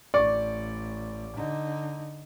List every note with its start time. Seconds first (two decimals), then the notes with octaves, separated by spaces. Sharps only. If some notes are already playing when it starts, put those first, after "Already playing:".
0.14 A1 D5 C#6 D6
1.36 D3 D#4